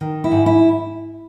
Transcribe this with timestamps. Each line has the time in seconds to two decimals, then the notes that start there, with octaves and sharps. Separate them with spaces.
0.01 D#3
0.24 E4
0.31 G#2
0.46 E4